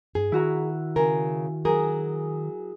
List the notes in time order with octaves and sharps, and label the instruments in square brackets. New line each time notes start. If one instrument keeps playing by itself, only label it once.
[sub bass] G2 [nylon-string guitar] G#4
[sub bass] D#3 [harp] E4 F#4 A#5
[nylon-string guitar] C#3 A#4 [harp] G#5
[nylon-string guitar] F#3 A#4 [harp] G#4